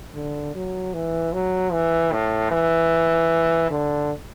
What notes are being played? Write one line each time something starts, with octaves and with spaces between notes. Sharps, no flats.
D3
F#3
E3
F#3
E3
A2
E3
D3